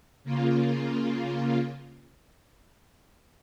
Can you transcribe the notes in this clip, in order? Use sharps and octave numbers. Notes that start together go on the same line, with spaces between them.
C#3 A#3 F4